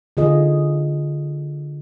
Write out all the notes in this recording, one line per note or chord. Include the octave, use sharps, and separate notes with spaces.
D3 F4 G#4 D#5